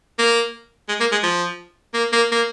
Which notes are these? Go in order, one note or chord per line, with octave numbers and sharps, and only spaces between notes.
A#3
G#3
A#3
G#3
F3
A#3
A#3
A#3